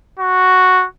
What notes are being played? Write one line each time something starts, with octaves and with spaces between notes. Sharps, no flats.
F#4